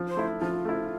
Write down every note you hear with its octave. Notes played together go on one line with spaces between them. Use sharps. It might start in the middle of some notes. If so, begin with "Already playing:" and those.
Already playing: F3
C5
A3 E4
F3 F4
A3 E4